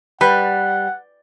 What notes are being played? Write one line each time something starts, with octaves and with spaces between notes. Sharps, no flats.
G3 B4 F#5